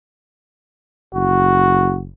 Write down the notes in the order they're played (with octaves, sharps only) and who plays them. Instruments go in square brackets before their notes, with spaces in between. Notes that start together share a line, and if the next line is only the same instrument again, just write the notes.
[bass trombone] F#1 [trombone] F#4